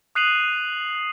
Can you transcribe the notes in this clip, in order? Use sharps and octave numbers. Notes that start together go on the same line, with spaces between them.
D#6 F#6 C7 D#7 F7 F#7